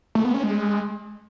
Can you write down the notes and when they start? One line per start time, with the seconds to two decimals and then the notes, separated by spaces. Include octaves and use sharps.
0.15 A3
0.25 B3
0.34 C#4
0.43 G#3